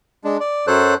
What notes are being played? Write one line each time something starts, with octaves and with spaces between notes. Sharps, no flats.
G#3 D4
D5
F#2 F#3 A4 C5 C#5 F#6